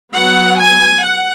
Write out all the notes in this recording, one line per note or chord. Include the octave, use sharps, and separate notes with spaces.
F#3 B3 F#5
G#5
F#5